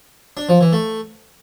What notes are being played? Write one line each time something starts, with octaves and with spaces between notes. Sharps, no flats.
D4
F3
E3
A3